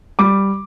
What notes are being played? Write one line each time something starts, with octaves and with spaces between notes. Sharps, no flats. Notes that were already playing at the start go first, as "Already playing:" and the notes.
G3 D6